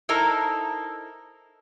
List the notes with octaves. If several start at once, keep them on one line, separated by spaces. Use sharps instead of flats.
D#4 E4 A4 A#4 C5